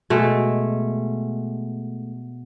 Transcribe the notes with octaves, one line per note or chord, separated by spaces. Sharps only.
B2 G#3 A3